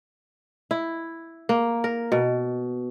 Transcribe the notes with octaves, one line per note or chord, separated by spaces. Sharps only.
E4
A#3
A#4
B2